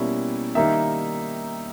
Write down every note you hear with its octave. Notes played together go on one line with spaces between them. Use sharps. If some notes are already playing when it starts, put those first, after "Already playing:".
Already playing: B2 G3 A#3 C#4 E4
D#3 G3 A#3 D#4 E5